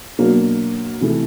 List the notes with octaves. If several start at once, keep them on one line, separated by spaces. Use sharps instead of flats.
B2 F#3 A#3 D4
C3 E3 A3